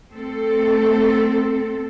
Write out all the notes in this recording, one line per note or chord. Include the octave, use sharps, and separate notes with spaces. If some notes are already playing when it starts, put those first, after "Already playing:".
A3 C4 A4